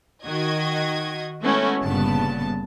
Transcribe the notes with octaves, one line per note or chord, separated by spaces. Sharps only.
D#3 F#4 D#5 G#6
G#3 A3 B3 C#4 E4 F#4
G1 G2 A#2 C#3 B3 A5